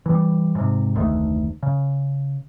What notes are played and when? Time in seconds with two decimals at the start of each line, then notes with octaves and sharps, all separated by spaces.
0.06 E3 F#3 G3
0.55 G#2 C3
0.94 F1 D2 D#3 A3
1.63 C#3